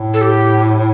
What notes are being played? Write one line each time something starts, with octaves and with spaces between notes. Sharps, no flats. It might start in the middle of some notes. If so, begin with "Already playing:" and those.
Already playing: A2
A4
G4